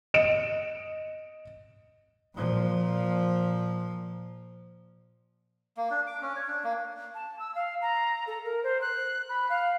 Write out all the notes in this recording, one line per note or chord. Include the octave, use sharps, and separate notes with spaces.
D#5 C#7 D7 E7
A#2 F3
A#3
D4
D6
C#4
C#5
D4
A#3
A5
E6
F5
A#5
A4
A#4
C5
F#6
B5
F5